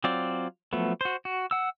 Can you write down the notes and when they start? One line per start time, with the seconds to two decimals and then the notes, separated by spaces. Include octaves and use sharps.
0.04 F#3 C4 F4 D5
0.73 F3 F#3 A3 B3
1.01 F#4 C5
1.25 F#4
1.51 F#5 E6